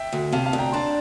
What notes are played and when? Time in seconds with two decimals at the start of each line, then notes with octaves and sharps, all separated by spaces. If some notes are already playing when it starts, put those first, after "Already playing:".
Already playing: E5 G5
0.13 D2
0.32 C3 F5 A5
0.46 F5 A5
0.53 D2
0.59 G5 A#5
0.72 D4 A5 C6